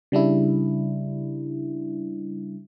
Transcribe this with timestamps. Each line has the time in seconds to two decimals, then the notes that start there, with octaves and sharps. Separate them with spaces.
0.12 C#3 G3 D4 E4